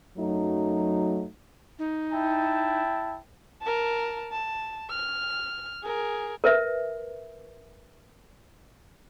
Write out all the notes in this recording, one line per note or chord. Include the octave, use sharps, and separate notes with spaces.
F#2 F#3 A3 D#4
D#4
E4 G5 A5
A#4 A5
A5
F6
G#4 A#4
A#4 B4 E5